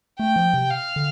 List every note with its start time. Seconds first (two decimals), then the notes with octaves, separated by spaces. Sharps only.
0.19 A3 G5
0.36 F3
0.54 C3
0.70 F5
0.96 D3